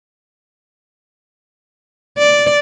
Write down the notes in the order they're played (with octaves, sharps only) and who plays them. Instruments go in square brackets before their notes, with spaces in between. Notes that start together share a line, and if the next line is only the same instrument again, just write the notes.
[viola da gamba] D5